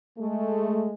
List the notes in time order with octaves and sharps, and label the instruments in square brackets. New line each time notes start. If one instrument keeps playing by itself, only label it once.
[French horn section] G#3 A3